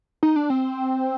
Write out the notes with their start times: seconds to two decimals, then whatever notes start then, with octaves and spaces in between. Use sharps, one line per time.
0.23 D#4
0.36 D4
0.50 C4